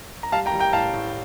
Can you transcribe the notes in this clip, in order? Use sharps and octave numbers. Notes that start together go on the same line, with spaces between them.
A#5
G3 F5 A5
G5 A#5
G3
G5 A#5
A2 F5 A5
A2